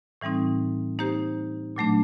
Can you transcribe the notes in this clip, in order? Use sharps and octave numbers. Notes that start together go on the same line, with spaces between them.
A2 E3 G3 C4 D#4
A#3 D#4 G4 C5
A#2 F#3 A3 D4